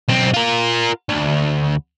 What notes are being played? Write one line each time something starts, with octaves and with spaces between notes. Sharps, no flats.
B1 C4
F4 A#4
D2